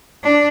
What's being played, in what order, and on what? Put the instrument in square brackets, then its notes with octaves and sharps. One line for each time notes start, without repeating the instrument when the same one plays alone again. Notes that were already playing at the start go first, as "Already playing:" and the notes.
[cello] D4